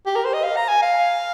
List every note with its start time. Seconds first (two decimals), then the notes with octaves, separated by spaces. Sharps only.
0.07 G4
0.16 A#4
0.25 C5
0.34 D#5
0.44 F5
0.57 A#5
0.68 G#5
0.82 F5